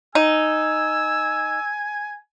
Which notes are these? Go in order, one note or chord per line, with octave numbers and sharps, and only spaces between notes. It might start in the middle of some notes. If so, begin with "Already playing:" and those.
D#4 G#5 E6